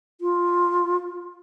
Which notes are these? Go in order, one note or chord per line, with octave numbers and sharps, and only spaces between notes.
F4